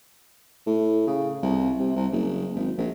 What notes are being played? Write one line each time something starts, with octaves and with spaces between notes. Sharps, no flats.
A2
C#3
C2
C3
C2
F#1
G#1
A#1